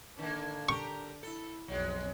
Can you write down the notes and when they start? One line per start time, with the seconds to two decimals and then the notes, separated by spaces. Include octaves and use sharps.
0.19 D3 D#3 A#3 D4
0.69 G4 A#4 C#6
1.23 E4 A4
1.68 B1 F2 F#3 G#3